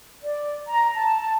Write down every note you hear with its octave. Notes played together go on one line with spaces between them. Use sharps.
D5
A#5
A5